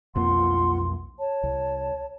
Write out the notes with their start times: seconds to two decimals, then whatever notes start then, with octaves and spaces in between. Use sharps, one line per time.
0.15 B1 F2 A#3 F4 F#5 C6
1.19 C#5 A5
1.43 C2